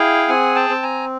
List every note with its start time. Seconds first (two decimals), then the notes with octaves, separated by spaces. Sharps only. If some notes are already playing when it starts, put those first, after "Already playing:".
Already playing: E4 G#4 F5 G5
0.28 C4 F#5 G#5
0.56 G5 A5
0.69 C4
0.83 G#5 A#5